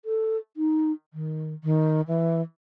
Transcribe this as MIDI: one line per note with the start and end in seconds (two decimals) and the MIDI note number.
0.05 0.37 69
0.57 0.92 63
1.14 1.54 51
1.64 2.01 51
2.07 2.41 52